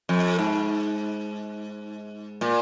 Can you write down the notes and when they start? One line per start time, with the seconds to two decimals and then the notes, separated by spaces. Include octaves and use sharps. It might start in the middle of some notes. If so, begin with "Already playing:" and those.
0.09 F2
0.39 G#2
2.41 A#2